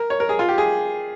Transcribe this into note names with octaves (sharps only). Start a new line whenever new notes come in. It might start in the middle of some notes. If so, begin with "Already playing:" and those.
Already playing: A#4
C#5
A#4
G#4
F4
G4
G#4